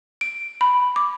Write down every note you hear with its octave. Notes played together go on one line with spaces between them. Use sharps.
D7
B5
D6